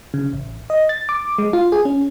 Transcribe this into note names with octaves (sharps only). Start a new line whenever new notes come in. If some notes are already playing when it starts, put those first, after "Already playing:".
C#3
A1
D#5
A6
D6
G#3
F4
G#4
C#4